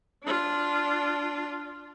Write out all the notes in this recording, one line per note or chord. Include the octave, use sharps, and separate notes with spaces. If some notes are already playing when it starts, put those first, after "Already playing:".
D4 F4